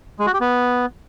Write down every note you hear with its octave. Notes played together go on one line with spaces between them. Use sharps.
G#3
F#4
G4
B3